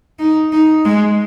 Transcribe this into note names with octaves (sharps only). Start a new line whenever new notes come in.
D#4
D#4
G#3